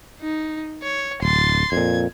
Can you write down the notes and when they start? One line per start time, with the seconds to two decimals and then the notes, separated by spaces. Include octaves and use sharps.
0.21 D#4
0.83 C#5
1.22 D1 C6 A6
1.72 F2 A#2 G#6